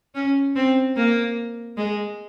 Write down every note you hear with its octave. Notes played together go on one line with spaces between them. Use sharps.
C#4
C4
A#3
G#3